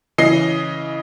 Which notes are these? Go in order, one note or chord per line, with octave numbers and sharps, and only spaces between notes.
C#3 E3 D#5 C7